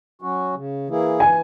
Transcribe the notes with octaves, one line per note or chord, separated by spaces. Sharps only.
F#3 C#4 F#4
C#3
E3 A#3 E4 G#4
E3 G#5